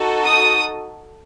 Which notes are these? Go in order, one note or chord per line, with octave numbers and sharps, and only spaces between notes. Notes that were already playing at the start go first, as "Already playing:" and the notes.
Already playing: D#4 F#4 A4
D#6